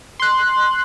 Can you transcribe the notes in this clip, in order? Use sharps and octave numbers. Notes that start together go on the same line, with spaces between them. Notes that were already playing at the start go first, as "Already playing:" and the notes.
C6 F#6